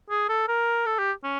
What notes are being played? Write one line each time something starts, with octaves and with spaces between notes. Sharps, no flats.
G#4
A4
A#4
A4
G4
C#4